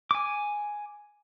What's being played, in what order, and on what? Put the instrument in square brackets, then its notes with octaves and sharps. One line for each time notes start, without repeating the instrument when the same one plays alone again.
[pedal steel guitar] G#5 D6